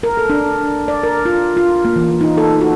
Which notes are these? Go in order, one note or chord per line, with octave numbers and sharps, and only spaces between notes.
A#4
A4
D4
D5
A#4
F4
F4
A#3
E3
D#4
A4
F#4